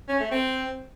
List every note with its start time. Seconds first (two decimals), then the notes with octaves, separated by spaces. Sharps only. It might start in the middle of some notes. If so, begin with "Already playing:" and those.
0.08 C#4
0.20 A3
0.31 C4